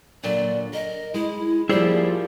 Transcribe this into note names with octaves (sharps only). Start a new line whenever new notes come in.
A#2 D3 F#3 D5
A#4 D#5
G#3 E4
F3 G3 A#3 E4 G#4 C5 D5